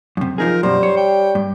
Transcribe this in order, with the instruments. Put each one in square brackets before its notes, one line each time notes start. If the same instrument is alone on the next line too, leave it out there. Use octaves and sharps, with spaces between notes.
[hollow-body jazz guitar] F#2 C3
[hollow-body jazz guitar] F3 D#4 G#4 [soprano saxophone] A#4
[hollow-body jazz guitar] F#2 B2 [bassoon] G3 [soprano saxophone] C5
[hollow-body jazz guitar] C#5
[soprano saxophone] G5
[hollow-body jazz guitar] G2